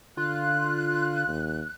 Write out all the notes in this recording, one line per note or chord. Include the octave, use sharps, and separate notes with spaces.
D3 F4 F#6
D#2